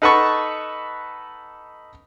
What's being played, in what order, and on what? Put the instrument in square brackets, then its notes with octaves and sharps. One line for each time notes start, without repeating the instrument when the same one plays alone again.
[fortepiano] D#4 A4 B4 F#5 A5 C#6